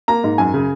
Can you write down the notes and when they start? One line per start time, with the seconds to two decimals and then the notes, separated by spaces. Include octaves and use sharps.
0.08 A#3 A#5
0.24 G#2
0.38 F#2 G#5
0.54 C#3